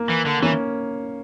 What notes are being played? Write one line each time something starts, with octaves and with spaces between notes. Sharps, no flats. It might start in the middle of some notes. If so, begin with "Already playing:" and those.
Already playing: A#3
E3
D3
E3 A#3 C#4